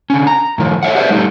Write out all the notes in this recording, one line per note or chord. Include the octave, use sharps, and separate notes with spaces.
D3 C#4
A#5
A2 D#3 F3
A4 C#5 E5 F#5
G4 G#4 B4 C5 D5 E5
G3 A3 D#4 G4